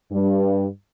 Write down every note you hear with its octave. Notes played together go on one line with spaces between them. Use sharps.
G2